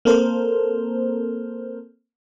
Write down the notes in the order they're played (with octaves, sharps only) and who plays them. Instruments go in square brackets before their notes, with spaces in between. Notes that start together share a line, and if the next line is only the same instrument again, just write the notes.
[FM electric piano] A#3 C4 A4 A#4 C5